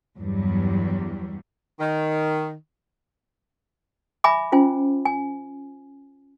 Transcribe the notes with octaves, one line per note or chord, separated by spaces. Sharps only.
E2 G2 F#3 G3
D#3
E5 G#5 B5 D6
C#4 F4 C5 G#5
G#5